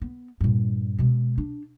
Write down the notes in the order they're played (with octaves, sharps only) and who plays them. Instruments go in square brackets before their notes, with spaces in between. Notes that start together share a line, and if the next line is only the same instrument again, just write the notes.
[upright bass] B3
G2 A#2
B2 G#3
D4